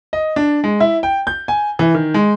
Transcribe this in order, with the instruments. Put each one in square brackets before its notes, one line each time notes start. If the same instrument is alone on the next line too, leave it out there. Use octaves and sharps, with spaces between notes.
[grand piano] D#5
D4
G#3
E4
G5
G6
G#5
E3
D#3
G#3